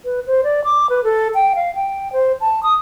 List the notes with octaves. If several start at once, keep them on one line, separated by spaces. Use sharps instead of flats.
B4
C5
D5
D6
B4
A4
G5
F5
G5
C5
A5
D#6